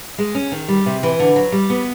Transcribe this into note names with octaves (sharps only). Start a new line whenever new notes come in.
G#3
C#4
D#3
G3
C3
E3
D3
F#3
G3
B3